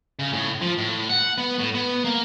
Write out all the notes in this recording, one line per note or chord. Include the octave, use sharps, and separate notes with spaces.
C#3
A2
F3
A2
F#5
B3
A2
B3
A#3